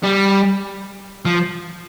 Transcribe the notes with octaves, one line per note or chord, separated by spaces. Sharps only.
G3
F3